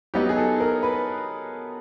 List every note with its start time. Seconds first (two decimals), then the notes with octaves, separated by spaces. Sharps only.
0.14 F#3 B3 D#4 G4
0.29 G#4
0.37 A4
0.60 A#4
0.83 B4